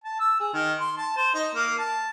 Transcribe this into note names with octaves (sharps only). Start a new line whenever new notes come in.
A5
E6
G#4
D#3
C6
A5
C5
D#4
A#3
A5